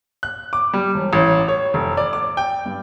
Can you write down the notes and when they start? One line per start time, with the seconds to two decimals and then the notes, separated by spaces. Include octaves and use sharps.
0.23 F#6
0.53 D6
0.73 G3
0.94 E1
1.13 A1
1.48 C#5
1.74 F1
1.97 D5
2.13 D6
2.37 G5
2.66 G2